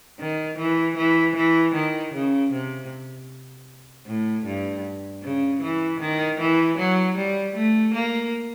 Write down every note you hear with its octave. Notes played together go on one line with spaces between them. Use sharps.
D#3
E3
E3
E3
D#3
C#3
C3
A2
G2
C#3
E3
D#3
E3
F#3
G3
A3
A#3